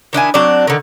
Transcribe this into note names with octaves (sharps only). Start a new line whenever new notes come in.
D#3 D4 E4 G#5
F#3 C4 D4 D5
D3 D#3